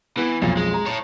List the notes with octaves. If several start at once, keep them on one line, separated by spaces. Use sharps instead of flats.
E3 B3
B1 F2 A#2
G#3
A#5
A4 C#5